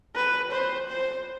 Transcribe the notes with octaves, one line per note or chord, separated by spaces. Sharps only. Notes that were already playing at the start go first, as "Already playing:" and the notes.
B4
C5
C5